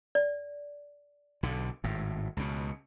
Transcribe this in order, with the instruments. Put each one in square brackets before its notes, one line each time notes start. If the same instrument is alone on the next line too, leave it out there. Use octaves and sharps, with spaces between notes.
[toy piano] D5
[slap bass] B1 D3
G#1 A2
C#2 B2